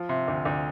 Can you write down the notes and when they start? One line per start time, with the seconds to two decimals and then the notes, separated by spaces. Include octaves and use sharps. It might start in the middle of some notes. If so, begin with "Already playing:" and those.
Already playing: F3
0.09 C3
0.28 D2
0.45 D2